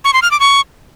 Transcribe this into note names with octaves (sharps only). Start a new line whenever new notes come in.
C#6
C6
F6
D6
C#6